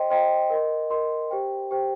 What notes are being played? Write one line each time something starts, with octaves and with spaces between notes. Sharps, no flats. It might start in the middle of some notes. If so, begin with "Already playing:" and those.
Already playing: C5 D#5 G5 C6
C5 D#5 G5 C6
A#4 D#5 C6
A#4 D#5 C6
G4 C5 G5
G4 C5 G5